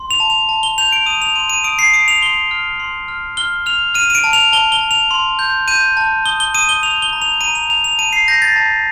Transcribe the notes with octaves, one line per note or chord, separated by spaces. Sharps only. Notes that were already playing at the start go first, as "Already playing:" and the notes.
Already playing: C6
F7
A5
F7
A5
G7
G6 F7
D7
D#6 D#7
F7
C6 D#7
D#7
D#6 D7
C7
D#6 D7
F7
C6 G7
F6
C6
F6
F6 G7
F6 F7
F6 D#7
D#7
D7
A5
F7
A5 G7
G7
A5
F7
C6
G6
G6 D#7
A5
D#6 G7
G7
D#6 D#7
G7
D#6 F7
G7
A#5
F7
A#5 D#7
F7
A#5 F7
F7
A5 D#7
C7
G6 A#6
A6
A5